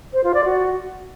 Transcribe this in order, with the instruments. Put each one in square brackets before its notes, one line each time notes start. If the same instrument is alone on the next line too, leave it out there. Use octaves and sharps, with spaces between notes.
[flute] C5
F4
D5
F#4